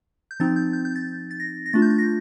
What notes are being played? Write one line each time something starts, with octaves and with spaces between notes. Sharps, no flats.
G6
F3 C4 D#4 A6
G6
G6
G6
A6
A6
A#6
A#6
A3 D4 F4 A6
G6
A6
A#6